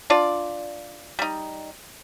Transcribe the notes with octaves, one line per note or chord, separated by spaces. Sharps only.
D4 F4 D5
G3 D#4